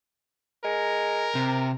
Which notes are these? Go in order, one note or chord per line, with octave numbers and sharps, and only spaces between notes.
G#3 A#4
C3